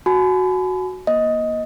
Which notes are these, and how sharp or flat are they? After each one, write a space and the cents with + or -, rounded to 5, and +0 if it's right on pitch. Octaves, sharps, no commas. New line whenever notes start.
F#4 +0 G#5 +35 B5 +35
A#3 +25 D#5 +10